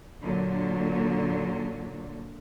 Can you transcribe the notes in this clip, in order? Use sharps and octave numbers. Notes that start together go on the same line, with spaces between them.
A#2 D3 F#3